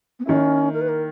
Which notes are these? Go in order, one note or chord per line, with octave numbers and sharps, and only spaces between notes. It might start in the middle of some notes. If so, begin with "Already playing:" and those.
B3
D#3 A#3 C#4 E4
A#4
B4
A#4